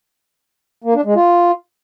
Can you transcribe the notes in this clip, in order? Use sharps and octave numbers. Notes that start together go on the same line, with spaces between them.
A#3
D4
G#3
F4